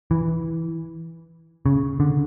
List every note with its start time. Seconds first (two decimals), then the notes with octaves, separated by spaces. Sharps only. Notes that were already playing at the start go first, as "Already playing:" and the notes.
0.11 E3
1.66 C#3
2.00 D3